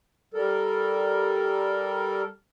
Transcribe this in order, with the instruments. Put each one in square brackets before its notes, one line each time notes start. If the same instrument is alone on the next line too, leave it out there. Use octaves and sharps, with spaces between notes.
[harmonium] G3 A4 A#4